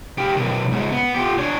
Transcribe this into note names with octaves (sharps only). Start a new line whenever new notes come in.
G4 F5
B1 D#3
G#2 C#3
B3
F4 G4
D4 C#5